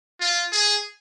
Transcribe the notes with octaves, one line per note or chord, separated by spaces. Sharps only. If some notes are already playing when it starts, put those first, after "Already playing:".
F4
G#4